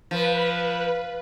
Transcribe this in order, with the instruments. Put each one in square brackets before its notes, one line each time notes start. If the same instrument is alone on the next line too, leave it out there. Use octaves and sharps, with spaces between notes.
[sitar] F3 [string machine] B4